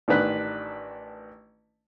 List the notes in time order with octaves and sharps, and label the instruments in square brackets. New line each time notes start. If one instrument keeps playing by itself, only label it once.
[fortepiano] A1 D#3 D4 B4 F#6